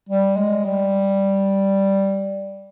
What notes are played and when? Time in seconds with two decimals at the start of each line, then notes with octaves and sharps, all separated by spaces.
0.09 G3
0.37 G#3
0.65 G3